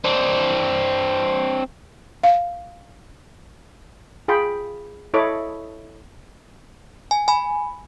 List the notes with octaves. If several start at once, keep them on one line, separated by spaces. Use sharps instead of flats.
C4 D4
F5
F4 G#4 G5 B5 C6
E4 A4 C#5 D#5 B5 D6
G#5
G#5 B5